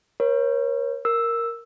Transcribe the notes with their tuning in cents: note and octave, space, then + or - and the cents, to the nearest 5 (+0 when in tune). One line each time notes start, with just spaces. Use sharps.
A#4 +35 C#5 -20
A#4 +0 E6 +0